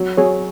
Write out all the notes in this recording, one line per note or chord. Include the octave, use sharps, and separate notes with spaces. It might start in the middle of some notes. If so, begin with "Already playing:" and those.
Already playing: F#3
F#3 G#4 C#5